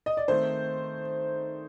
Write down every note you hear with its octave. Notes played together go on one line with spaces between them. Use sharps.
D#5
D5
D#3 A3 C4 D#4 C5